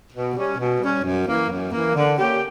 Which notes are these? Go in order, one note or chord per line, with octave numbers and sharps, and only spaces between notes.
B2
G3 C#4
B2
G3 C#4
F#2
E3 A#3
F#2
E3 A#3
D3
A#3 C#4 G4